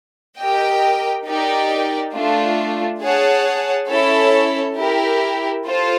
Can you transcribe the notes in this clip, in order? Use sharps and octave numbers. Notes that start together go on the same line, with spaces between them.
G4 A#4 D#5 G5
D#4 G4 A#4 D5 G5
A3 D4 F4
G#4 C#5 F#5 A5
C#4 E4 A4 C#5
E4 G4 A#4
F4 A4 C5